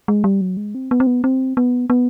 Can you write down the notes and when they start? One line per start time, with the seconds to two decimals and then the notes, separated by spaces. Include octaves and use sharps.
0.08 G#3
0.24 G3
0.41 F#3
0.57 G#3
0.75 C4
0.91 B3
1.00 C4
1.07 B3
1.24 C4
1.57 B3
1.90 B3